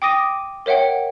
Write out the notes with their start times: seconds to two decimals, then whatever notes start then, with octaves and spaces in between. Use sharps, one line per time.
0.02 G5 D6 D#6 A#6 D#7
0.66 A#4 C#5 E5 F#5 G5